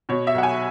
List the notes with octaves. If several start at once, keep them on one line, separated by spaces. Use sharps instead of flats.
B2 C#5
E5
B1 F#5
G#5